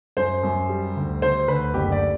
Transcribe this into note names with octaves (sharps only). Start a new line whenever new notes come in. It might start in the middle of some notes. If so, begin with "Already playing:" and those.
F#2 C5
F#2
G3
D2
D3 C5
D2 B4
F#1 G4
D5